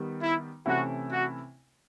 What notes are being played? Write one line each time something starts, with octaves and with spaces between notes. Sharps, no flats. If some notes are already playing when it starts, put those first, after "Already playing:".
Already playing: D#3 G3 B3
E4
C3 E3 A3 C#4 E4 F#4
F#4